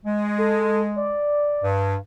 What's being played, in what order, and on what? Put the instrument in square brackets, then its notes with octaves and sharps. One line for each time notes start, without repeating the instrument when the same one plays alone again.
[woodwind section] G#3
[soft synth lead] A4
D5
[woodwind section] G2